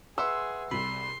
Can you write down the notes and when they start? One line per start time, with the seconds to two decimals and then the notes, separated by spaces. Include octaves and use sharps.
0.18 G#4 B4 E5 F#5 C6 E6
0.71 C2 C3 B5 C6